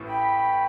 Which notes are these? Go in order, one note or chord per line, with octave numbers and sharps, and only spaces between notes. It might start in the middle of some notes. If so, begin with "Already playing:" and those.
Already playing: A1 A2 E3
G5 B5